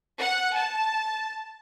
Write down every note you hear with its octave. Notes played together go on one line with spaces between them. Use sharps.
F#5
A5